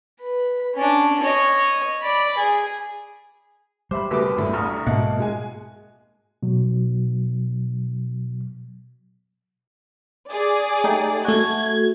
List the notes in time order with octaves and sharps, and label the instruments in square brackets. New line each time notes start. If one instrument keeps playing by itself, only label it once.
[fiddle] B4
C#4 D4
C#5 D#5
D5 B5
G#4
[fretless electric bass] G3 [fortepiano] C5 E5 B5 [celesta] D6
[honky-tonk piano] F#1 A3 B6 [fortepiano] B2 D6 [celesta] G4 B4
[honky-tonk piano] A#1 A2
[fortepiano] A1 D2 F6 [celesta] A#5 D#6 [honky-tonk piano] C#6
[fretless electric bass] G#2 B2 [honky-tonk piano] A#3 [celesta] D#5 E5 A5 [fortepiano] F#5
[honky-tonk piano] G#3 G#5
[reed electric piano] B2 F#3
[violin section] G#4 D5
[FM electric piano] A3 D#4 G4
[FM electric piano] A3 F#4 [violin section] G#6